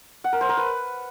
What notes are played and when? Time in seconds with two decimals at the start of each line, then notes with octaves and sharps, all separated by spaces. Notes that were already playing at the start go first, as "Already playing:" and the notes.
0.24 F#5
0.33 A#4
0.41 C5
0.49 A#4
0.57 B4